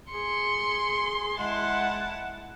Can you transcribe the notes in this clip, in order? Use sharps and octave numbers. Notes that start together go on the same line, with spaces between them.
G#4 C6 C#7
G#3 E4 F#5 A5